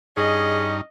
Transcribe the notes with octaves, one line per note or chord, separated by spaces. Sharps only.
G2 C#4 D#4 G#4 D#5